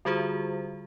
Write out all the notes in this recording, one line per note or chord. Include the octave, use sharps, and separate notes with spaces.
D3 G3 F4 F#4 G#4 C5